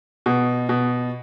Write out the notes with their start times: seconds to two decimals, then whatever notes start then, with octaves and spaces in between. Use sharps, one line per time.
0.26 B2
0.69 B2